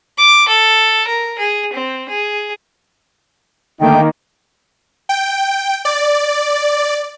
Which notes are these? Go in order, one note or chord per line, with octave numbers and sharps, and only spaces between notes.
D6
A4
A#4
G#4
C4
G#4
D3 D#3 A3 A#3 D#4 G5
G5
D5